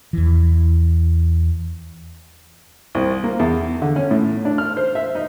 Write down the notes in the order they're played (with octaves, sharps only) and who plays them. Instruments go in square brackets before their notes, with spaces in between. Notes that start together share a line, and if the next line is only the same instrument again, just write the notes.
[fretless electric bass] E2 E3
[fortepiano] C2
A#3
E2
D3
C#4
A2
D4
F6
C5
E5
D#4